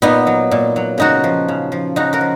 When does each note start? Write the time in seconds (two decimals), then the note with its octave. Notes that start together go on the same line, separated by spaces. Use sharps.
0.02 A#2 B3 D#4
0.27 F#3
0.51 A#2
0.76 F#3
0.98 C#3 D#4 F#4
1.24 F3
1.48 C#3
1.72 F3
1.96 C#3 D#4 F#4
2.13 F#4 A#4
2.21 F3